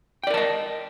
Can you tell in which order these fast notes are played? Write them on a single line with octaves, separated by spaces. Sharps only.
G5 D5 A#4 A5 D#5